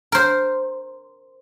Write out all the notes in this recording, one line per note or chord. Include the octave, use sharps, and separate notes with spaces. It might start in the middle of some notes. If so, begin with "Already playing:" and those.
A#4 C5